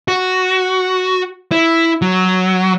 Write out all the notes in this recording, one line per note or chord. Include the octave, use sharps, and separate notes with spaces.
F#4
E4
F#3